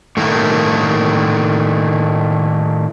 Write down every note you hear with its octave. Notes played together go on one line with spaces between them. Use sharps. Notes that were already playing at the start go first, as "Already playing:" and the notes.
A2 D#3 A3 A#3